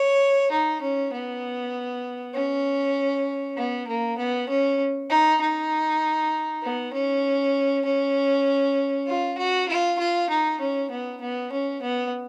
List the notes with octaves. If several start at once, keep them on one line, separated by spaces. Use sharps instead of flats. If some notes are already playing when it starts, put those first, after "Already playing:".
Already playing: C#5
D#4
C#4
B3
C#4
B3
A#3
B3
C#4
D#4
D#4
B3
C#4
C#4
F4
F#4
F4
F4
D#4
C#4
B3
B3
C#4
B3